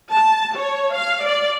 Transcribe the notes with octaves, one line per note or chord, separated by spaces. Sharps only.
A5
C#5
F5
D5